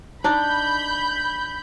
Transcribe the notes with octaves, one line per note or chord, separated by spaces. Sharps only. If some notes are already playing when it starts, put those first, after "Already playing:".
D4 D#4 B5 G6